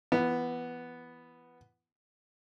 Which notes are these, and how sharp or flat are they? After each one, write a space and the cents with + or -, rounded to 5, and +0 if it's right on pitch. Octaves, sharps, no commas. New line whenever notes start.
E3 +35 B3 +0